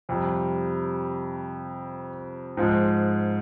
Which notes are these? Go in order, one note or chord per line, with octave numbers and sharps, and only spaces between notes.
F2 C3 G3
G#2 F3 G#3